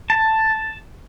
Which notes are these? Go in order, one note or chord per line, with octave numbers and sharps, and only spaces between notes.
A5